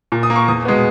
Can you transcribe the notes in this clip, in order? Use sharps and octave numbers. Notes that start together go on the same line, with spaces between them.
A#2
D#6
A#3
C#6
E2 D#6
B2 G#3 B3